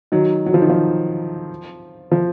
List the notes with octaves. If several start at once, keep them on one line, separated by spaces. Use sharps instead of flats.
D#3 F#3
F#3
F3
D#3
F3
F3